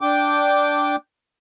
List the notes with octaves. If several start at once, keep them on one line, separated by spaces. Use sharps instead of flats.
D4 G5 D6